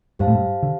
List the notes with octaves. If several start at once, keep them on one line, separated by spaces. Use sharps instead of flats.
G2 G4 C5 F5 A5
A2
G2
D3